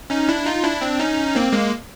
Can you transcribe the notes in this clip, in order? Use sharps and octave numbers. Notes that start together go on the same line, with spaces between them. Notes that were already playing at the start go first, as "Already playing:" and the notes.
C#4 D#4
D4 E4
D#4 F4
D4 E4
C4 D4
C#4 D#4
A#3 C4
G#3 A#3